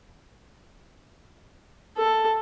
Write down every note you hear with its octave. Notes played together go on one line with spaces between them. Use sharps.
A4